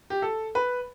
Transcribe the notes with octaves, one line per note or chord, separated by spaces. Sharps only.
G4
A4
B4